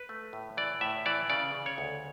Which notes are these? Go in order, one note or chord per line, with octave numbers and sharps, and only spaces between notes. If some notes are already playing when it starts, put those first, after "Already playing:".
Already playing: B4
A3
A2
E3 D5
A2 E5
E3 D5
C#3 D5
C#3
C#5
D2